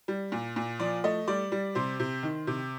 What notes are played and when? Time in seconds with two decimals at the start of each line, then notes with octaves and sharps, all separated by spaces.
0.08 G3
0.32 A#2
0.56 A#2
0.80 F3 D5
1.04 A3 D#5
1.28 G3 D5
1.52 G3
1.75 C3 C5
2.00 C3
2.23 D#3
2.47 C3